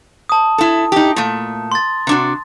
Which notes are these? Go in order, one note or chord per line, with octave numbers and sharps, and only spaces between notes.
A5 D#6
E4 A4
D#4 G4
A#2 A3
C6 A6
C3 D4 F#4